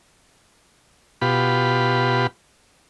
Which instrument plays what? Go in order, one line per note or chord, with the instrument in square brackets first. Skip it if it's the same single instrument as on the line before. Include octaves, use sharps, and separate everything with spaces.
[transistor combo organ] B2 F4 G4 B5